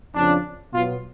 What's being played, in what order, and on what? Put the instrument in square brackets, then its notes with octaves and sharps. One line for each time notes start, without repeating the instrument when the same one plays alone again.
[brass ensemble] F2 C#3 F3 D4
B2 F#3 B3 F4